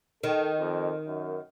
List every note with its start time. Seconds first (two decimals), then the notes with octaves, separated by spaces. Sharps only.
0.23 D#3 A4
0.59 F2
1.07 F#2